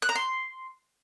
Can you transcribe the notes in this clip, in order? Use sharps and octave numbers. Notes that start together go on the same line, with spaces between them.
F#6
A#5
C6